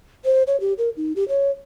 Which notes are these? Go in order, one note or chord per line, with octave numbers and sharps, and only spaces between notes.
C5
C#5
G4
A#4
D#4
G4
C#5